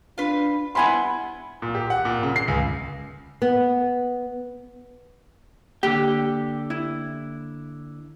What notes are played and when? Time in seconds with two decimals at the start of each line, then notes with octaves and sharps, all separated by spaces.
0.18 D4 F4 B4
0.75 G3 B3 E4 F#5 G#5 B5 C6
1.62 A#2
1.75 G4
1.90 F#5
2.05 A#2
2.23 C#3
2.36 C7
2.48 C#2
3.42 B3
5.83 D3 A#3 G4 G5
6.70 E4